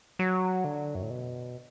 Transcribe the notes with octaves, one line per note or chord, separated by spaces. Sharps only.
F#3
D3
F#2
A2
B2